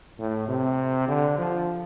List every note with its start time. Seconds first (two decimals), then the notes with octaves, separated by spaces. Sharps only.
0.19 A2
0.48 C3
1.08 D3
1.38 F3